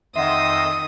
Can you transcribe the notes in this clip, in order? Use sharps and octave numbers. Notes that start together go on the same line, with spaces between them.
F2 D#3 D#5 E5 F#5 C6 D#6 E6